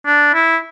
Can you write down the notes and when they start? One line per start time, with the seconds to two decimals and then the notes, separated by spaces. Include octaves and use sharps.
0.06 D4
0.34 E4